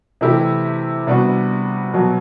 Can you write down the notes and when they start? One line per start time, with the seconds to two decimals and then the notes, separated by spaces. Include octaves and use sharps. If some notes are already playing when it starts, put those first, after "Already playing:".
0.21 C3 E3 A3 E4 G4
1.07 C3 G3 B3 D4 F#4
1.94 B2 F#3 B3